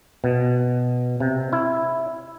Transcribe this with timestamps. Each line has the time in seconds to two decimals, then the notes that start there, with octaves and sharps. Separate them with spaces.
0.24 B2
1.20 C3
1.53 E4